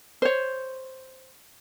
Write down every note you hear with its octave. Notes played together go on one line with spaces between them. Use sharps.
C5 C#5